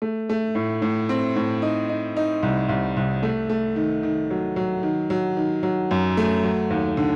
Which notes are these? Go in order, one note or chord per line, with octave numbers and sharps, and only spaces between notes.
A3
A3
A2
A2
C4
A2
D#4
D#4
D#4
C2
C2
C2
A3
A3
D#3
D#3
F#3
F#3
D#3
F#3
D#3
F#3
F#2
A3
F#3
D#2
D3